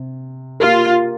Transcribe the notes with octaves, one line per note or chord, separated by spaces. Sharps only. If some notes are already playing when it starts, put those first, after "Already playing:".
Already playing: C3
A#3 F4 G4 A#4